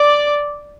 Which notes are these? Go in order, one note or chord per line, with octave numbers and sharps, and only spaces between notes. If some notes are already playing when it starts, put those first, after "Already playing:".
Already playing: D5